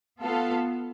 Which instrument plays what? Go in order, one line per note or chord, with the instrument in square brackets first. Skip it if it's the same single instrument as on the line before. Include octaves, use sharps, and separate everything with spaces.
[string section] B3 F4 A4 F5